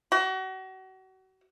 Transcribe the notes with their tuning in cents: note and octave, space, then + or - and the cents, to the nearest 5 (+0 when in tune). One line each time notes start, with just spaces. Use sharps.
F#4 +35